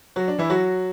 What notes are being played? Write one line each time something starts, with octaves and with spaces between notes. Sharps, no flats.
F#3 F#4
D4
E3 E4
F#3 F#4